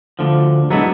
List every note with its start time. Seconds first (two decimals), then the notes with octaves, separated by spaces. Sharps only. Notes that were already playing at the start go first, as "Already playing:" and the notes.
0.19 D2 D3 F3
0.71 F#3 G#3 A3 B3 D4 E4